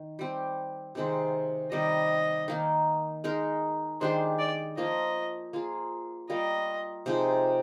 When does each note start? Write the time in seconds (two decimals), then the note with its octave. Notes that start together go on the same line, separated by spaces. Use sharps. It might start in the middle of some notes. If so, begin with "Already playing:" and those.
Already playing: D#3
0.19 G3 C4 G4
0.95 C3 D#3 G#3 C4
1.72 C3 D#3 G3 D#5
2.48 D#3 A#3 D#4
3.24 G#3 D#4 A#4
4.01 D#3 G#3 D4 G4 C5
4.39 D5
4.77 F3 A#3 F4 D#5
5.53 A#3 F4 G#4
6.30 G3 A#3 F4 A#4 D#5
7.06 C3 F3 G#3 D#4